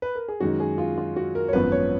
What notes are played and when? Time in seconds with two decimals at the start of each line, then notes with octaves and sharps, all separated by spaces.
0.02 B4
0.15 A#4
0.28 G#4
0.40 F#2 D#3 G#3 F#4
0.60 G#4
0.78 F4
0.98 F4
1.16 F#4
1.35 A#4
1.48 C#5
1.53 G#1 F#2 F3 B3 B4
1.72 C#5